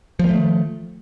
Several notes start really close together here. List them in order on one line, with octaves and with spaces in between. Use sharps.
F3 A#3 A3 D#3